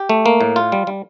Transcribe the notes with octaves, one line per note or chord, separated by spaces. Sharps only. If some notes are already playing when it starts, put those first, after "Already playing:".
Already playing: G4
A3
A#3
A2
F4
G3
G3